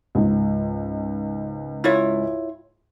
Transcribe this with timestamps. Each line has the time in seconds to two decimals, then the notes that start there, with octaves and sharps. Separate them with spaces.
0.15 C#2 G#2
1.84 E4 F4 C#5